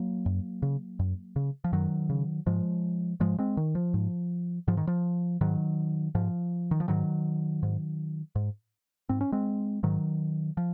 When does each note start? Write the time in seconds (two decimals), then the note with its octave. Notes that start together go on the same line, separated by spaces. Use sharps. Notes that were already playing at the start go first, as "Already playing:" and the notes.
Already playing: F#3 A#3
0.26 F#2
0.62 C#3
0.99 F#2
1.36 C#3
1.64 F3
1.72 F#2 D#3 F#3
2.10 C#3
2.47 G#2 F3 G#3
3.20 G#2 F3 G#3
3.39 G#3 C4
3.57 D#3
3.75 F3
3.94 G#2
4.68 G#2 F3
4.77 D#3
4.87 F3
5.41 G#2 D#3 F#3
6.15 G#2 F3
6.71 D#3
6.80 F3
6.88 G#2 D#3 F#3
7.63 G#2
8.36 G#2
9.09 G#2 C4
9.21 C#4
9.32 G#3 C4
9.83 G#2 D#3 F#3
10.57 F3